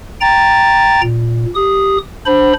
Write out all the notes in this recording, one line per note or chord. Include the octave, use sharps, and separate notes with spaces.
G5 A#5 A6
A#2
G4 D#6
D4 C5 B5